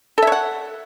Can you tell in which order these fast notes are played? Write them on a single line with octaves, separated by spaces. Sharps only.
A4 E5 C#5 F#5